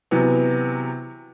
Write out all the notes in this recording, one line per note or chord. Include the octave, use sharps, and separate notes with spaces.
C3 E3 F#3 B3